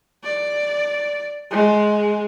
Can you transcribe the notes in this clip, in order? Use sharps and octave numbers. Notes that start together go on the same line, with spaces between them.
D5
G#3